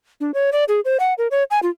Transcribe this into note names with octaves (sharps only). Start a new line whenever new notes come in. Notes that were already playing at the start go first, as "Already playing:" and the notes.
D4
C#5
D5
G#4
C5
F#5
A#4
C#5
G#5
F4